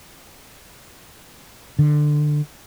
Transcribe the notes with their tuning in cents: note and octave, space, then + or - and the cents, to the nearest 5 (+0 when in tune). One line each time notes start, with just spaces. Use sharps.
D3 +20